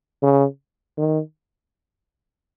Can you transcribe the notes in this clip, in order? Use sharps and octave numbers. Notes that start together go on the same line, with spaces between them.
C#3
D#3